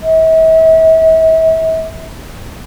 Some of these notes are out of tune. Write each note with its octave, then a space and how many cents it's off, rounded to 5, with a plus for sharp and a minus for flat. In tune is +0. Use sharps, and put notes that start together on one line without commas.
E5 -40